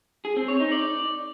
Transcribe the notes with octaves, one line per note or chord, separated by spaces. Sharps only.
G#4
C4
C#5
D#4
D5